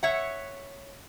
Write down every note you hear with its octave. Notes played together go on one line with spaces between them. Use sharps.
C#5 E5 F#5